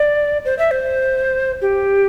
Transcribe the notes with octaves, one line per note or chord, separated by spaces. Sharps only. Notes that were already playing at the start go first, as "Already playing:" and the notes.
Already playing: D5
C5
E5
C5
G4